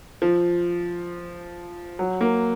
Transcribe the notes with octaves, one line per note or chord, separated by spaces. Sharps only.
F3
F#3
A#3